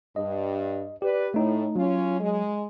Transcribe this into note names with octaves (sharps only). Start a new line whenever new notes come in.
G2 D#5
G4 B4 D5
A2 A3 D#4
F#3 C#4 F4
G#3